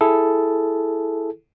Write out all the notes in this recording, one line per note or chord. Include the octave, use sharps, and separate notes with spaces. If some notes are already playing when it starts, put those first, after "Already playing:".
E4 G#4 A4